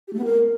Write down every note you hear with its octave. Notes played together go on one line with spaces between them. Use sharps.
G4
A3
B3
A#4